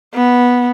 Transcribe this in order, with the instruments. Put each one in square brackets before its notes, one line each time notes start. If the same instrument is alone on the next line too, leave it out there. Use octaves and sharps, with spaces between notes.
[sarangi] B3